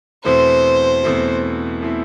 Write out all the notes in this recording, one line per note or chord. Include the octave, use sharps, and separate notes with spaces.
E2 B2 A3 C4 E4 C5
E2 B2 A3 C4 E4
B2 A3 C4 E4